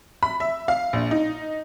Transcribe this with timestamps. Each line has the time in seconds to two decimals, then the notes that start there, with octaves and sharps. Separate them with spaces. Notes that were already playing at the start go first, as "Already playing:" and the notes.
0.23 B5
0.40 E5
0.68 F5
0.93 A#1
1.11 D#4